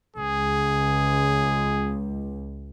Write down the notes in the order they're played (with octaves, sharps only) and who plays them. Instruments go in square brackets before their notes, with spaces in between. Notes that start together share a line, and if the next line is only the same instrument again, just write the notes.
[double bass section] C#2 [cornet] G#4